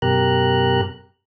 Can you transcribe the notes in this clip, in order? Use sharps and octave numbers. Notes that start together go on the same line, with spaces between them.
F#2 B2 G4 A#4 A#5 F#6